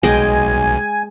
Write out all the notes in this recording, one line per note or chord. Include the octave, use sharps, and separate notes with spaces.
B1 G#3 D#5 G5 G#5